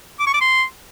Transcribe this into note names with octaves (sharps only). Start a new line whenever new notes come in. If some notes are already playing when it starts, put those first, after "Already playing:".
D6
C#6
D6
C6